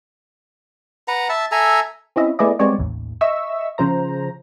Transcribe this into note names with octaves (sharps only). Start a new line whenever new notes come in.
B4 F#5 A#5
E5 A5
A4 E5 G#5 A#5
C4 C#4 E4 D#5 E5
A3 B3 E4 G#4 D5 D#5
G3 G#3 B3 C4 C#5 D5
A1 D#2
D#5 E5 C#6 E6
C#3 F3 C5 A#5